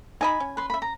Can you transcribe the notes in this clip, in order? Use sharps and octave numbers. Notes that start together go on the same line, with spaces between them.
D#4 D#5 G#5 B5
C#4
B4 C6
E5 B5
A#5